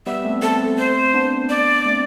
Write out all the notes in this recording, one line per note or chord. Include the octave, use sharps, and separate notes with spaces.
G3 B3 E5
A3 C4
A3 C4 A4
C5
B3 D4
D5
A3 C4